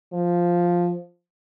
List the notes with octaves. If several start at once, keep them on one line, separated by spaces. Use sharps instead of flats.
F3